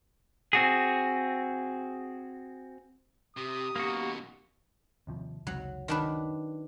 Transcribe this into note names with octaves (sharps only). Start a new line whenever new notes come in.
C4 F#4 G#4
C3 G4 D#6
F#2 B2 A#3 F#4
D#2 C3 F3
F#1 C#2 C3 F#3
D#3 D4 B4